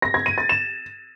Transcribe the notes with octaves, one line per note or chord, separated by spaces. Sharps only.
A#6
G#6
D#7
A6
E7